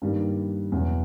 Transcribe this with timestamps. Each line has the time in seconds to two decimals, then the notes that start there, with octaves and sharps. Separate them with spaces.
0.02 G2 D#3 G3 A#3
0.72 E2 B2 F#3